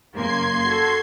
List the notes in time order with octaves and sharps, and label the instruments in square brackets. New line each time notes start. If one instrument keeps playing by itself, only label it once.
[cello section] F#2 C#3 A#3 [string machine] C6 G#6 C7
[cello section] F#4 A4